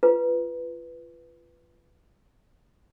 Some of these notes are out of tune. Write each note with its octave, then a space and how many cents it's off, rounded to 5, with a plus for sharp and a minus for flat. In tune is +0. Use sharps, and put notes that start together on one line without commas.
F4 -20 B4 +0